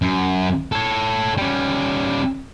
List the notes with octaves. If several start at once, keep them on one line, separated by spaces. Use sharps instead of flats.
F#2
A4 C#5
G3 C#4